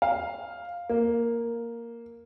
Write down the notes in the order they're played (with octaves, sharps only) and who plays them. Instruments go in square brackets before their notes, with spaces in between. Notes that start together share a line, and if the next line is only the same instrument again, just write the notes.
[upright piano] F5
A#3